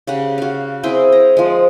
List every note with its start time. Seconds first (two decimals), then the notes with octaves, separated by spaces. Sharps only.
0.07 C#3 G4 F#5
0.38 F#4 F5
0.83 C4 E4 G#4 G5
1.12 A#5
1.37 F3 G#3